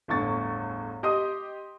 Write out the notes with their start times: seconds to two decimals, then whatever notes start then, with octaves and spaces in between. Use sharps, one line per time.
0.08 G1 E2 A2 C#6 A6
1.03 G4 D#5 C6 D#6